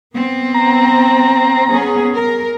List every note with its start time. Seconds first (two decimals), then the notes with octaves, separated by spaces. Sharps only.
0.15 B3 C4
0.54 A#5
1.70 B3 C#4 G#4
2.13 A#4